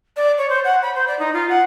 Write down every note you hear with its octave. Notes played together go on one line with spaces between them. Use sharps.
D5
C#5
C5
F#5
B5
C5
D5
D#4
F4
F#5